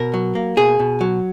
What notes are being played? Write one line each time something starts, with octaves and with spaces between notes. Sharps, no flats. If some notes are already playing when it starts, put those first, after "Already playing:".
Already playing: B2 A#4
F#3
A#3
B2 G#4
B2
F#3